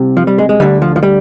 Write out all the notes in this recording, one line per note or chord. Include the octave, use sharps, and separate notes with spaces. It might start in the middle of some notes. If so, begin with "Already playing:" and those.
Already playing: C2 C3
F3
G3
G#3
G#3
D2 D3 G3
F3
F3
G3